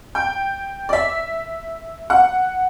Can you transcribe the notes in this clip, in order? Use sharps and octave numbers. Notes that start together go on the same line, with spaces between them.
G5
D5
E5
F#5